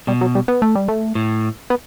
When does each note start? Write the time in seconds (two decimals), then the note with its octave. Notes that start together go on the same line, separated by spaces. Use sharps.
0.07 B2 G3
0.21 F#3
0.35 G3
0.48 B3
0.62 A3
0.75 G3
0.88 A3
1.15 A2
1.70 B3